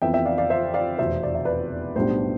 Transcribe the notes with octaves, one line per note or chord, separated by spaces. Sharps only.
F2 E3 B3 E4 E5 G5
E5 G5
D5 F5
D5 F5
C5 E5
D5 F5
F1 E2 B2 C5 E5
D5
E5
B4 D5
B1 A2 G3 B3 D4 C5